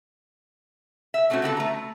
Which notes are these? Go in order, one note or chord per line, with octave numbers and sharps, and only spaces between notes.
E5
G3 A3 C4 C#4 F#4
D3 B3 F#4 A4
A3 A#5